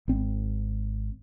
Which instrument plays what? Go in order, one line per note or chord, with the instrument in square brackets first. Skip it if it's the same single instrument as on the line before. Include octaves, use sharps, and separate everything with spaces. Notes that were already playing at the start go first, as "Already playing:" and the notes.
[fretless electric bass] G#1 C4